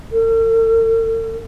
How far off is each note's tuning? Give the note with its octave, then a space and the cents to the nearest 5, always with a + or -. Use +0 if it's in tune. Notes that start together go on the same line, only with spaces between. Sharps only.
A4 +45